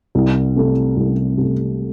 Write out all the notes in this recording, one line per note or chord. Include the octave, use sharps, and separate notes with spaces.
C2
C3 A3
C2
C3 A3